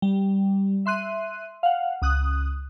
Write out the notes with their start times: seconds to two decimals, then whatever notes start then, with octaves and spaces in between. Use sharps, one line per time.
0.02 G3
0.86 E5 C6 F#6 D#7
1.63 F5 F#5
2.02 C#2 D#6 F#6